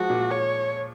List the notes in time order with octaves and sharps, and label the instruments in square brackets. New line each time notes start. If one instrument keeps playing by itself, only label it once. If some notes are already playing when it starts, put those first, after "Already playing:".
Already playing: [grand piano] F3 G#3 [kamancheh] F#4
[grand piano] A#2
[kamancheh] C#5